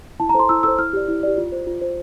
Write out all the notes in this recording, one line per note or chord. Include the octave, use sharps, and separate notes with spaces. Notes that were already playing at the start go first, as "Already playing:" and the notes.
E4 A5
A#5
A4 C5
C6
E4 E6
A4 C5 E6
E4 F6
G4 D5
E4
G4 D5
F4
C5
F4
C5